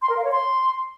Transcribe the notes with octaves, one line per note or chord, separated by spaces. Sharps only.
C6
A#4
F5
C#5
C6